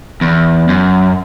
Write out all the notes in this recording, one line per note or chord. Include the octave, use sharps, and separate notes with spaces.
E2
F#2